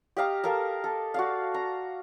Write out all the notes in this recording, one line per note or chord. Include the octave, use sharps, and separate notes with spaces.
G4 D#5 F5 A#5
A4 A#4 F5 A#5
A4
F#4 D5 F5
A#5